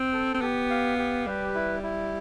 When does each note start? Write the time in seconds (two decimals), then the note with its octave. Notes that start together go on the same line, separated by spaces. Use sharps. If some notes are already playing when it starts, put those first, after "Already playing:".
Already playing: C4
0.13 A4
0.34 C4
0.42 B3 G4
0.70 F5
0.98 G4
1.27 G3 B4
1.55 E4
1.83 E4